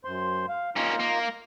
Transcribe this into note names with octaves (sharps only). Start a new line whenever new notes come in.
F#2 C5 C6
F5
A#3 C#4 D#4 F4
A#3